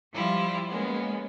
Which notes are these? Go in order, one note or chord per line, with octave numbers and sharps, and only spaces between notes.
F3 G3 E4 F4
G#3 A#3 B3 C#4